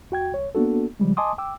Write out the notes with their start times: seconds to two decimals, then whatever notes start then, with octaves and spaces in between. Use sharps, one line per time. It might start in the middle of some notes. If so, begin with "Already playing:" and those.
0.11 E2 F#4 G5 G#6
0.32 C2 C#5
0.55 A#3 B3 D4 F#4 A4
1.00 C#3 F3 G3 G#3
1.17 D#5 G#5 A5 C6 D6 D#6
1.38 G5 D6 E6